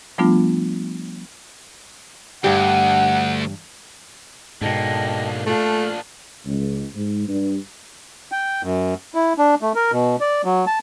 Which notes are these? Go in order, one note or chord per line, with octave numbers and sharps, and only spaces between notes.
F3 G3 A3 B3 D4 F4
D2 G2 G4 F#5
G#2 B2 D3 A#3 D#5 G5 A5
A#2 A3 D4 F4
C#2
G#2
G2
G5
F#2
E4
D4
A3
A#4
B2
D5
F#3
A5